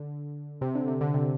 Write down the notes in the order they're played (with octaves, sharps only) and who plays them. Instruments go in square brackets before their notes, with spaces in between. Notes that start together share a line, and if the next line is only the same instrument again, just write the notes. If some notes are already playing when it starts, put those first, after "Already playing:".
Already playing: [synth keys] D3
C3
D3
C3
D3
C3